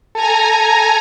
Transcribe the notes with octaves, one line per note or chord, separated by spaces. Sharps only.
A4 G#5 A#5